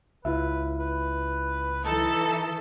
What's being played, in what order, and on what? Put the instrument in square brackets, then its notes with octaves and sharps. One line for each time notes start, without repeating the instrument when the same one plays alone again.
[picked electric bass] C#2 [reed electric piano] E4 F4 E5 [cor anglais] B4
[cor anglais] B4
[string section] E3 A4 [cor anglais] D#4